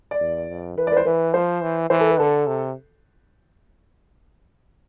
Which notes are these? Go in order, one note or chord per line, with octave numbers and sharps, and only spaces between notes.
D5
E2
F2
E3 B4
D5
B4
C5
E3 B4
F3 C5
E3
E3 C5
A4
B4
D3 A4
C3